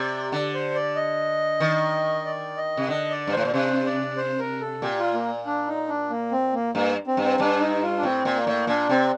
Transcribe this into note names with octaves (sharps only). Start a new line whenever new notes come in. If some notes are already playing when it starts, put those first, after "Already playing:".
Already playing: C3 D5
D3 D5
C5
D5
D#5
D#3
D5
D#5
C3
D3 D#5
D5
G2
C5
A2
A#2
C3 C5
D5
C5
A#4
A4
A#2 G4
F4
A#3
D4
D#4
D4
A#3
C4
A#3
G2 A#3
C4
G2
C4
G2 D4
D#4
F4
D4
A2 C4
A#2
A#3
A2
A#2 D4
C3 C4